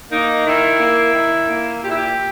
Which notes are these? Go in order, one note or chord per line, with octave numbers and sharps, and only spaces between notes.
A#3 D#4
D#3 E4
A#3
D#3
A#3
A#2 G4
E4
G4